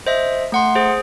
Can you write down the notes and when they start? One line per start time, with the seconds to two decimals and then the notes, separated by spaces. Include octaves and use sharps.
0.07 C5 D#5 E5
0.52 A3 F#5 C6
0.75 G#4 C5